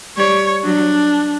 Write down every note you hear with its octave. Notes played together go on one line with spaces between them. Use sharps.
G3 C#5
F#3 D4